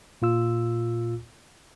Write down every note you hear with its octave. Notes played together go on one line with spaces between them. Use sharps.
A#2 F4 E6